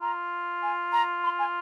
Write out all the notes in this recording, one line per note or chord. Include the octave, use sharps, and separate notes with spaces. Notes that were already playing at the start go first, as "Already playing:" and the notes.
F4 A#5
G#5
A#5
C6
G#5